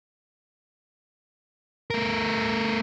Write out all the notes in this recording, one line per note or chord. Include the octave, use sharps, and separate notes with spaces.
A3 A#4